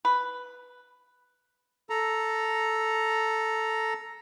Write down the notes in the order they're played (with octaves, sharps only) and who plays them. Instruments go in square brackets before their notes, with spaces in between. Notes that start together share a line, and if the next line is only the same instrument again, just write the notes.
[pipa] B4
[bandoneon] A4 A#5